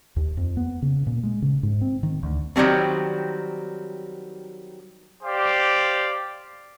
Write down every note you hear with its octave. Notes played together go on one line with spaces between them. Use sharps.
D#2
F2
B3
C#3
A#2
G#3
C#3
G#2
C4
D#3
D2
D#3 F#3 G3 A3 C4
G4 C5 D5 F5